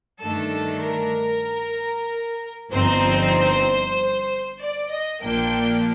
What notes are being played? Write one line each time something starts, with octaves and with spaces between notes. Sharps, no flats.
G2 D#3 A3 D4 A4
A#4
G1 G2 F3 C4 D#4 C5
D5
D#5
A#1 A#2 F3 A#3 D4 G5